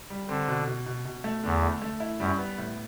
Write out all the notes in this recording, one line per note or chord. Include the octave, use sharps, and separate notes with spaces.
G3
D3 C4
B2
B2
B2
B2
A3
E2 D3
A3
A3
E4
F#2 G3
B3
A2